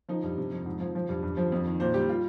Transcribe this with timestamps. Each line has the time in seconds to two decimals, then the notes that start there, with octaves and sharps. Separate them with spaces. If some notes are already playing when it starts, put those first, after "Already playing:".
0.09 F3 D#4
0.23 G2
0.37 C3
0.52 F2
0.66 G#2
0.80 F3
0.95 F3
1.09 G2
1.23 G2
1.37 F3
1.52 F2
1.65 D#3
1.80 A#2 C5
1.94 G3 G4
2.09 F4